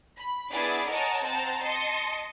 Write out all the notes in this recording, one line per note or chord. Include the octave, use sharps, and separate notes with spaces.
B5
B3 D4 E4 G#4 D6 A6
A#4 C#5 D#5 F#5 G#5 A5
C4 C5 F#5 A5 A#5
D#5 A5 C6 C#7